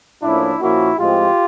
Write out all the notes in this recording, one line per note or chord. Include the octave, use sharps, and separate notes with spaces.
A2 F3 A#3 C#4 D4 E4
A#2 F3 A#3 C#4 E4 F#4
A2 F3 G#3 C4 F4 G4